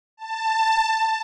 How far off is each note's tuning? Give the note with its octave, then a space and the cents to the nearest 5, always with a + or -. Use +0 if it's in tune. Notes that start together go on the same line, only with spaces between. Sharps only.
A5 +15